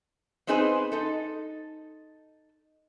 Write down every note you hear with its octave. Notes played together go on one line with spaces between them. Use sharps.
B3 C4 D#4 G#4 B4 C5
D#4 A4